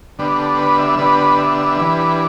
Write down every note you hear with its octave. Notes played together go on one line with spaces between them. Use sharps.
D3 G3 B3 D4
A4
B4
E5
D3 G3 B3 D4 B4
E5
E3 G3 D4 B4